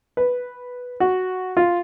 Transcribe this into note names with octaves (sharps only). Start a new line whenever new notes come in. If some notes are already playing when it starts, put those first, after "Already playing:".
B4
F#4
F4